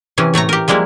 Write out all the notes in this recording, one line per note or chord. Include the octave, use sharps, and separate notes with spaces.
C3 E3 C#4
A2 A3 C#5 A#5
G4 A#4
F3 G3 G#3 A#3 E4